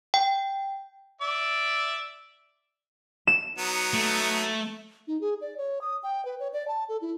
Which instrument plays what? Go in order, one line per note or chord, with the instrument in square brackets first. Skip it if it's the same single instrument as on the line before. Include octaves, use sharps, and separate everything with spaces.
[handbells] G5
[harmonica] D5 E5
[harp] E7
[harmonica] F#3 B3 D#4
[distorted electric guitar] A3
[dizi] D#4
G#4
D5
C#5
D#6
G5
B4
C#5
D5
A5
A4
E4